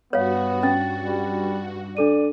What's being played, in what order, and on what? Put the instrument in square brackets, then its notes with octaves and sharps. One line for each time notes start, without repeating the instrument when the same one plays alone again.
[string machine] G2 F#4 [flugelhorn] B3 [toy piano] C#5 F5
[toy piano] C#4 [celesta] A6
[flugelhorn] G3
[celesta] D4 A4 D#7 [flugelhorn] D5